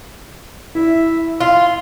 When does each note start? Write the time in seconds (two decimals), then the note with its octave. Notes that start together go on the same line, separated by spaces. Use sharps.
0.75 E4 E5
1.40 F4 C6